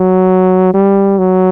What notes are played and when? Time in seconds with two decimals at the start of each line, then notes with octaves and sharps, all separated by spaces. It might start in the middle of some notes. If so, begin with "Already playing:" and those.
Already playing: F#3
0.74 G3
1.19 F#3